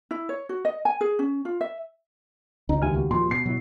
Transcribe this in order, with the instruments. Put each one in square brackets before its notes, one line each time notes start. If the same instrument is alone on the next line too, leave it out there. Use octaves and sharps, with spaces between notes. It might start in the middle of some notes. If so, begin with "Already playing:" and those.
[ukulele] E4
C#5
F#4
D#5
G#5
G#4
C#4
F4
E5
[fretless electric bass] C#2 [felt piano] D#4
[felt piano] D#2 [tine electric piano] E5 G#5 F6
[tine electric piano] A#3 F#4 G4
[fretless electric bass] A#2 F3 [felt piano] C6
[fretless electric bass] B2 [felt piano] C7
[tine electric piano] B2 E4 [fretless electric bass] F#3